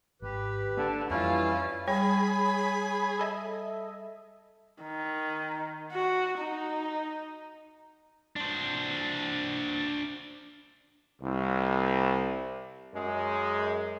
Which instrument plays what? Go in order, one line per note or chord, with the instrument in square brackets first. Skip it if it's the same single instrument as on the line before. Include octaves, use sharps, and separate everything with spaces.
[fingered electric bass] G#1 [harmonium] G4 B4
[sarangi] D3 [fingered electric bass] A#3
[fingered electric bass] F2 [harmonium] E3 G3 [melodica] C#4 E4 [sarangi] F4
[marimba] G3 [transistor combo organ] G#4 [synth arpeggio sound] C#5 [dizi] B5
[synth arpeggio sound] A4 D#5 E5
[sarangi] D#3
F#4
D#4
[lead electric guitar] D4 C5
[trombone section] C2
F#2 G#3